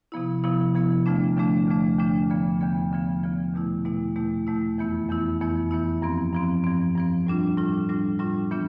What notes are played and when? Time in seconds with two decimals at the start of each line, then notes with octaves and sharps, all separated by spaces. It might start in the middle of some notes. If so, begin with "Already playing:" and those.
0.12 C3 F3 B3 E4
0.44 C3 F3 B3 E4
0.75 C3 F3 B3 E4
1.06 E2 D3 F3 A3 D4
1.36 E2 D3 F3 A3 D4
1.67 E2 D3 F3 A3 D4
1.99 E2 D3 F3 A3 D4
2.30 E2 D3 F3 B3
2.61 E2 D3 F3 B3
2.92 E2 D3 F3 B3
3.23 E2 D3 F3 B3
3.54 E2 B2 A3 E4
3.85 E2 B2 A3 E4
4.15 E2 B2 A3 E4
4.47 E2 B2 A3 E4
4.78 F2 E3 B3 E4
5.09 F2 E3 B3 E4
5.41 F2 E3 B3 E4
5.71 F2 E3 B3 E4
6.02 G2 F3 C4
6.33 G2 F3 C4
6.64 G2 F3 C4
6.95 G2 F3 C4
7.27 A2 G3 D4 F4
7.57 A2 G3 D4 F4
7.89 A2 G3 D4 F4
8.19 A2 G3 D4 F4
8.51 E3 B3 D4 F4